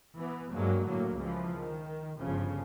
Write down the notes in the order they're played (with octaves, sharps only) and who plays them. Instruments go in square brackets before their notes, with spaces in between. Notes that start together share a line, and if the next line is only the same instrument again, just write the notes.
[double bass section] E3 B3
G2 F#3 G#3 A#3
A2 D3 F#3 A#3
C#2 E3 F3
D#3
G1 G2 C#3 F3